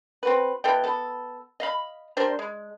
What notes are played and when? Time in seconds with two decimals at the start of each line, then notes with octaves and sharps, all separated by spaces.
0.23 C4 F#4 B4
0.64 B2 E3 A4 G5
0.84 B3 A4
1.60 D#5 F5 B5
2.17 G3 D4 A#4 C5
2.39 G#3